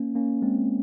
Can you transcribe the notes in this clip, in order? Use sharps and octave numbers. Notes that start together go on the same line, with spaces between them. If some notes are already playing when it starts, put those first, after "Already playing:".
Already playing: A#3 C#4
A#3 C#4
G#3 C4